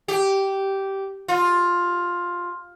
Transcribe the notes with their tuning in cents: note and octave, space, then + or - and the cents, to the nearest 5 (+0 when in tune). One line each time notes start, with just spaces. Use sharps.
G4 -10
F4 +10